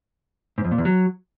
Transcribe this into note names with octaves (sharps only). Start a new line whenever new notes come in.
G#2
F2
A#2
E2
F#3